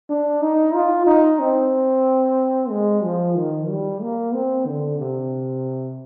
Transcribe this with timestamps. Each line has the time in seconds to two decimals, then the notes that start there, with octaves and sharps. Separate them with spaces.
0.09 D4
0.42 D#4
0.74 F4
1.07 D#4
1.40 C4
2.70 G#3
3.04 F3
3.37 D#3
3.69 G3
4.02 A#3
4.34 C4
4.67 D3
5.00 C3